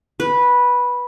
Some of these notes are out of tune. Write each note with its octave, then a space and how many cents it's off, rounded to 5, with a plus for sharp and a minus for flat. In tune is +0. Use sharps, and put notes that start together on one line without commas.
B4 -10